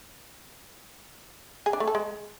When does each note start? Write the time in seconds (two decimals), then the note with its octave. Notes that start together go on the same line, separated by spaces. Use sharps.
1.66 G#4
1.73 D4
1.80 A3
1.88 A4
1.95 G#3